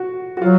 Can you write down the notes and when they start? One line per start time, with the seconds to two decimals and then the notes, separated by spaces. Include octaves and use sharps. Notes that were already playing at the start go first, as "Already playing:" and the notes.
Already playing: F#4
0.37 F#4
0.41 F#3 F4